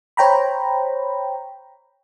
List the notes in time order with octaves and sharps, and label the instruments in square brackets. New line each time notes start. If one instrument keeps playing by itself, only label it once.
[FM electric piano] C5 C#5 G5 A#5 B5